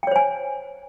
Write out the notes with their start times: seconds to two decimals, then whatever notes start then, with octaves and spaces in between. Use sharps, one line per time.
0.03 G5
0.07 C#5
0.11 C5
0.16 G#5